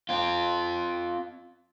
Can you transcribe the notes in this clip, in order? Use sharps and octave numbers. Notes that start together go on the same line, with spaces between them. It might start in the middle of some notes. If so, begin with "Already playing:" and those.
C4 F4